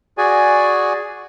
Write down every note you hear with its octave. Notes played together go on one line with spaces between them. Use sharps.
F#4 G#4 D5 G#5